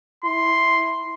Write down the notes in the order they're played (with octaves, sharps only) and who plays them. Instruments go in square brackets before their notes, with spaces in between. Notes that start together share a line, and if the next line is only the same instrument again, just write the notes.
[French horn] E4 [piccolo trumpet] C6